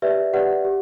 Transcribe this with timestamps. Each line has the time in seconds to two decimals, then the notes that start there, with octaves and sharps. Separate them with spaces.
0.02 G4 B4 D5 E5
0.33 G4 B4 D5 F#5
0.65 G4